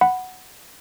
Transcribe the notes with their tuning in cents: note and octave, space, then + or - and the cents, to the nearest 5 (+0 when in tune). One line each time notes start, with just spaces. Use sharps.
F#5 +0 B5 +5